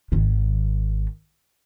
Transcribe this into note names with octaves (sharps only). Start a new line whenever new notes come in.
G#1 D#3